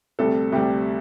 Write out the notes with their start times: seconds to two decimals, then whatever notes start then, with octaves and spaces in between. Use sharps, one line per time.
0.19 D2 C3 G3 A4
0.52 D2 C3 G3 G4